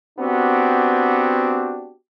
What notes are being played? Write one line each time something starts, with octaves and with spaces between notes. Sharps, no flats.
B3 C4 D4 F#4 G4